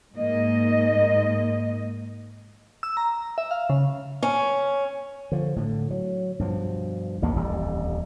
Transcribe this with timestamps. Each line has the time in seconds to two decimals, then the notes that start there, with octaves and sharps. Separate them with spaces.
0.17 G#2 A#3 D#5
2.83 E6
2.97 A#5
3.38 E5
3.51 F5
3.70 C#3
4.23 C#4
5.32 D3 F3
5.56 A2 D3
5.91 F#3
6.39 G2 B2 F3
7.22 A1 D#2 G#2 A#3
7.36 D#1 A1 F2 G3